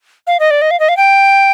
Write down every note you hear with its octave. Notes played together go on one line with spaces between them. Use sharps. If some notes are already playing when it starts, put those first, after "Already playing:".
F5
D#5
D5
D#5
F5
D#5
F5
G5